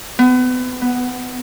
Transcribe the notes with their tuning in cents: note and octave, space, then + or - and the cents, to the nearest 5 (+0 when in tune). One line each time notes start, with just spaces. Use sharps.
B3 +30
B3 +5